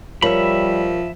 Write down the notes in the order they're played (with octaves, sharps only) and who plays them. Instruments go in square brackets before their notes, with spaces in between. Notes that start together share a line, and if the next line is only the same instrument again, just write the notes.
[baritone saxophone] F3 [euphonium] G3 [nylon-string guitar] A#4 C#5 [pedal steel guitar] E5 B5